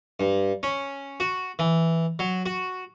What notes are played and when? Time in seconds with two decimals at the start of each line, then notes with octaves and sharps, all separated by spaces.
0.20 G2
0.63 C#4
1.20 F#4
1.59 E3
2.19 F#3
2.46 F#4